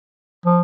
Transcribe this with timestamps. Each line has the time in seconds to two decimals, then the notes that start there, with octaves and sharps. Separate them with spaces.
0.46 F3